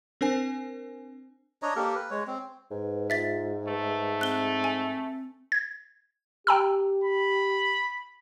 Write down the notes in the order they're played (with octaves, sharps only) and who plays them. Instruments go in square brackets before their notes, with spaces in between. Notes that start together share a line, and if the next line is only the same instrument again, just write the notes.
[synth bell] C4 D4 A#4 C5 G#5
[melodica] D4 C#5 D#5 A#5
A#3 G4 A4 A#4
B4
G#3 C#5
C4
[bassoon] G#2 [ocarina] B4
[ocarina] F4 [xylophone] E5 A6 B6
[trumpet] A3 [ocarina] B4
[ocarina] C4 [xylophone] F#6 G7
[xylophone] G#5
[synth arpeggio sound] G#6
[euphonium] G4 [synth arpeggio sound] G5 A#5 E6
[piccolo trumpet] B5